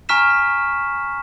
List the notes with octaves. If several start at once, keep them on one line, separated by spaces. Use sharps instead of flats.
G#5 A#5 C#6 F6 B6 E7